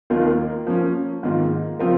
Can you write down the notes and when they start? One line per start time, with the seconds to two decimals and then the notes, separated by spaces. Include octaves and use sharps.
0.10 D#2 D#3 A#3 F4 A#4
0.67 F3 A#3 C#4
1.23 G#2 D#3 A#3 F4
1.79 C#3 F3 C4 F4 A#4